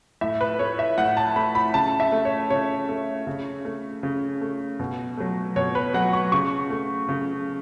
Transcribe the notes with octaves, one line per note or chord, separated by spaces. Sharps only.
A2 E5
B4
A3 C#5
E5
A2 F#5
A5
A3 B5
B5
C#3 A5
E5
A3
C#5
C#3 C#5
A3
C#3
A3
C#3
A3
B2
F#3 A3
B2 C#5
B4
F#3 A3 F#5
C#6
C#3 C#6
A3
C#3